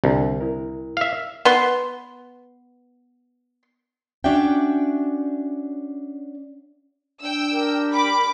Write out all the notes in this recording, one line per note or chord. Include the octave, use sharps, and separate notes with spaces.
C2 D3
E4 A#4
E5 F5
B3 C6
C#4 D4 F#4 D5 E5 G5
D4 G5 E6
G4 A#4
B5 D6